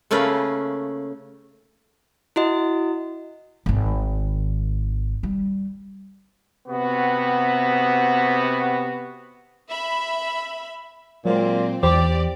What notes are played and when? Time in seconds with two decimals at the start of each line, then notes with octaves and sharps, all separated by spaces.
0.11 C#3 A3 A#3 C#4 B4
2.36 E4 F#4 D#5
3.66 G#1 D#3
5.23 G3
6.68 C3 B3 F#4
9.68 E5 B5
11.25 A#2 F#3 G#3 C4
11.83 E2 G4 C5 D5